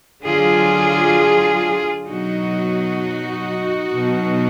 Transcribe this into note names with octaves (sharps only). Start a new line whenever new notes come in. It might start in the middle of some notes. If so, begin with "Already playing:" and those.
D3 F#3 F4 G#4
B2 F#3 D#4 F#4
B2 F#3